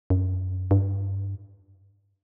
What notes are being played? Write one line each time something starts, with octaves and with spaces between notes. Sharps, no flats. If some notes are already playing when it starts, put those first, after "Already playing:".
F#2
G2